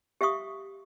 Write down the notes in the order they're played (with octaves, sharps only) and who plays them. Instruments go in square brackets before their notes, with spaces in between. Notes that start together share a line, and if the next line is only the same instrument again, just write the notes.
[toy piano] G4 E5 F5 C#6 D#6